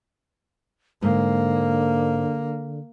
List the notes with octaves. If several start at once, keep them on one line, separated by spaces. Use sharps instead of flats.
G#2 D3 A#3